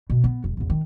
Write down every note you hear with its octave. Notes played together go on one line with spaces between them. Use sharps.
B2
B3
E1
A1 E2
D#3